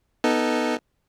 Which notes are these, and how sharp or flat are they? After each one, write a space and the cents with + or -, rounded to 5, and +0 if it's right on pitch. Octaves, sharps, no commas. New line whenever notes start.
B3 +0 D#4 +5 A4 +0